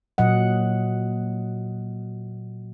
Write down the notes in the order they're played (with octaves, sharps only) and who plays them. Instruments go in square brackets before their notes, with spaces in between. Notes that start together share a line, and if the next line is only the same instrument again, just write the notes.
[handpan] A#2 F#3 D#5 F#5